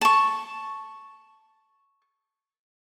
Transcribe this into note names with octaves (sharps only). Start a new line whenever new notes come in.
A5 C#6